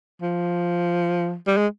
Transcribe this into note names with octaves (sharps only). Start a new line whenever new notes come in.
F3
G3
G#3